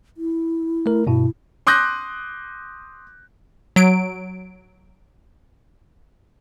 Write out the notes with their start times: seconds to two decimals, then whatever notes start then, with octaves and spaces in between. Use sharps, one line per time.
0.17 E4
0.86 A3 A#4
1.07 G2 B2 E4
1.67 C6 D6 D#6 F#6 G6 A#6
3.76 F#3 D7